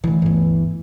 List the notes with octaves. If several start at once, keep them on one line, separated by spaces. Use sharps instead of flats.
D3 E3 A3
G1 D2